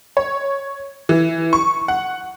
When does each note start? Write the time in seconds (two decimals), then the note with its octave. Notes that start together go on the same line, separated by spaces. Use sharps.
0.17 C#5
1.09 E3
1.53 C#6
1.88 F#5